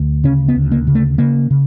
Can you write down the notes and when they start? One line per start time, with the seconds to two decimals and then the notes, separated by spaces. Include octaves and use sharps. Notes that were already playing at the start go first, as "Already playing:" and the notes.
Already playing: D2
0.24 C#3 C#4
0.48 B3
0.55 D2
0.71 A#3
0.87 C#3
0.95 A3
1.18 C#3 A#3
1.51 C#3